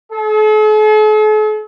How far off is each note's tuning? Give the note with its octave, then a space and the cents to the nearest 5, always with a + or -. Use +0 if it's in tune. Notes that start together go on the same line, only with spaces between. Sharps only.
A4 -45